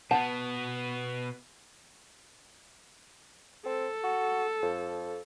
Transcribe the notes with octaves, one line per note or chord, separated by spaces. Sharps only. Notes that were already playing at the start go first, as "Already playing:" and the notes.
B2 B3 F#5 A5
C4 A4
F#4
F2